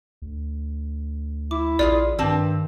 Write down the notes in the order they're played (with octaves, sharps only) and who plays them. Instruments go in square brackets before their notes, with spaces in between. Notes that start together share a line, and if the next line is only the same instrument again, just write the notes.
[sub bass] D2
[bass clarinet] E4 [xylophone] D6
[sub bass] A#1 [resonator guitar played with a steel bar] F4 G4 G#4 [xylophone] D5
[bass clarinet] G2 [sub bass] D#3 [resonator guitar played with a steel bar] C4 G4 A5